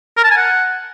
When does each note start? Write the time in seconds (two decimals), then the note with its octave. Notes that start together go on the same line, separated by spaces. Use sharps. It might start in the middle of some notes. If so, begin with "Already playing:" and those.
0.17 A#4
0.24 A5
0.31 G#5
0.37 F#5